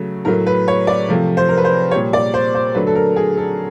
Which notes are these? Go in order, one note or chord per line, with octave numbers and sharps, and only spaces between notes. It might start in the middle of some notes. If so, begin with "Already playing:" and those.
Already playing: C#3 F#3 A3
A2 F#3 A3 A#4
B4
C#5
D5
C3 F3 A3
C5
A#4
B4
C5
A#2 G3 C#5
D5
C5
C5
D3 F#3 A3 B4
A4
A#4
G#4
A4